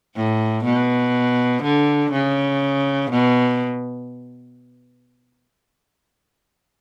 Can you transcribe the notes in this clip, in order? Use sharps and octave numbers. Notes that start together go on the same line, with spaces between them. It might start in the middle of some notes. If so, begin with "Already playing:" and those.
A2
B2
D3
C#3
B2